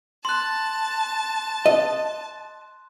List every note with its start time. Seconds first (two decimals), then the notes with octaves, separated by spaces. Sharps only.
0.25 A5 C6 F#6
1.66 D#5